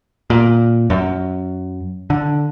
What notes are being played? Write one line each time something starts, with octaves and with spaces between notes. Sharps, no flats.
A#2
F#2
D3